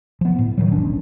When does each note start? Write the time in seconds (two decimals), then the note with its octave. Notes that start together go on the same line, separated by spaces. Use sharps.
0.21 F3 B3
0.39 A2
0.58 D#3 E3 F#3
0.71 F1 B1 C#4 D4